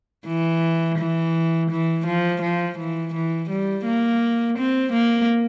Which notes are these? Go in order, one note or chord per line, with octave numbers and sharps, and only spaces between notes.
E3
E3
E3
F3
F3
E3
E3
G3
A#3
C4
A#3